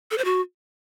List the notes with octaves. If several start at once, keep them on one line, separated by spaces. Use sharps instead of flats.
A4
C5
F#4